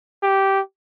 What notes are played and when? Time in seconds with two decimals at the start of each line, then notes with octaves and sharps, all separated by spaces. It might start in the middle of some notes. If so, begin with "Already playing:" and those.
0.23 G4